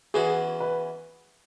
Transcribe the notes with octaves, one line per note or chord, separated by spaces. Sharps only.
E2 E3 C#4 F#4 G#4
B4